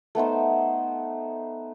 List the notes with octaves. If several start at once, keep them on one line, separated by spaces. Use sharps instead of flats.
A3 B3 D#4 C5